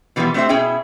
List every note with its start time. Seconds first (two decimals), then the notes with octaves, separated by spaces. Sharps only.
0.16 B2 E3 F3 G3 B3 F4
0.34 A3 C4 D4 G4 C5 E5
0.49 B2 C#4 E4 G#4 E5 G5